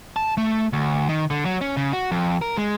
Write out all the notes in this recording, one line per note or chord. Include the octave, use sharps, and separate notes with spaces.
A5
A3
D2
D#3
D3
F#3
C#4
C#3
F#4
F2
A#4
G#3